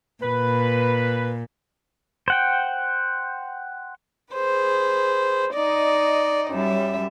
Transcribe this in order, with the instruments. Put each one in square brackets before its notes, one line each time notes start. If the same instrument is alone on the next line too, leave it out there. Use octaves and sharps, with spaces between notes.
[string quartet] A#2 [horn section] B4
[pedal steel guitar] C5 F#5 G5
[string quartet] G#4 B4 C5
D#4 D5 D#5
F#2 G3 E5